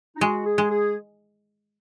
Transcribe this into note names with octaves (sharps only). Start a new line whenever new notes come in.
D#4
G#3 F#4
G#4
G#3
G#4